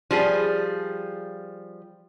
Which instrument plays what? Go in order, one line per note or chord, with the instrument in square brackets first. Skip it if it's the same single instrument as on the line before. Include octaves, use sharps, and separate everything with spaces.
[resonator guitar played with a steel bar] F3 G3 G#4